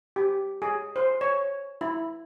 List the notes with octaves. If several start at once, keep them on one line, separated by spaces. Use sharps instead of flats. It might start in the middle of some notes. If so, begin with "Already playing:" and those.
G4
G#4
C5
C#5
E4